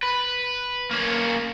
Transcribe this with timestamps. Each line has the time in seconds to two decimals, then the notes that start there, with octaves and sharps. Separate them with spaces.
0.03 B4
0.91 A#3 C#4